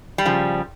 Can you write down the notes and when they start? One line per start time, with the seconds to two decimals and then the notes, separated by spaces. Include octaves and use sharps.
0.18 G3
0.25 C#3 F3